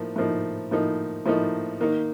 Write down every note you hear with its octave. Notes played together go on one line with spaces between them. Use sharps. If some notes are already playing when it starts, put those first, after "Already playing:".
Already playing: A2 F3 A#3 D#4
A2 F3 A#3 D#4
A2 F3 A#3 D#4
A2 F3 A#3 D#4
D#3 A#3 D#4